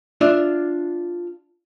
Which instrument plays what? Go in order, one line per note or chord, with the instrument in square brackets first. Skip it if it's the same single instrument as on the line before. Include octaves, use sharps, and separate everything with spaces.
[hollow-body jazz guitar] D4 F4 D5 E5